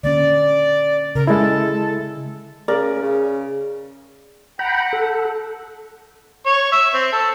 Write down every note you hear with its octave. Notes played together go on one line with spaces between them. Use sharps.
D3 A#3 C#4 D5
C#3 A#4
G#3 E4 A4
C#3 A#4 D5
C#3
F#5 G5 A#5 B5
A4
C#5
E5
C4
A4